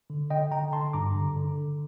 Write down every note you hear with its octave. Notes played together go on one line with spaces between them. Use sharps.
D3
D3 D#5 G5
D3 G5 A#5
D3 A5 C6
G2 A#5 D6
D3
D3
D3